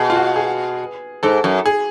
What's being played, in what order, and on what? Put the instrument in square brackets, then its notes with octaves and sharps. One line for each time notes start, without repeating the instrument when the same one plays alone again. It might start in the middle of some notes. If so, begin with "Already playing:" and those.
Already playing: [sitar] B2 [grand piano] G#4
[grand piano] F4
F#4
G#4
[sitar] G#2 [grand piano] A4
[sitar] F#2
[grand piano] G#4